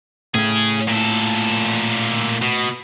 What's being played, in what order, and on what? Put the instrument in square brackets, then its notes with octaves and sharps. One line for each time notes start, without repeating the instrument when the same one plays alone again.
[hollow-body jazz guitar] A2 [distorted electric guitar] C#4 G#4
[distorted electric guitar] A#2 A4
B2